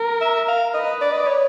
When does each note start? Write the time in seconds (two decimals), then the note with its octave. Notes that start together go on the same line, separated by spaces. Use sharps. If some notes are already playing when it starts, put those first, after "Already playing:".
Already playing: A#4
0.21 E5
0.48 F5
0.74 B4 D#5
1.01 D5
1.12 D#5
1.19 D5
1.27 C#5